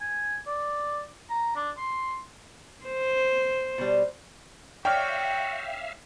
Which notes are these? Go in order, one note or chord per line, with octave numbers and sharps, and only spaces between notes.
G#5
D5
A#5
D4
C6
C5
B2 G3
F#4 C#5 D5 E5 F5 G5 F6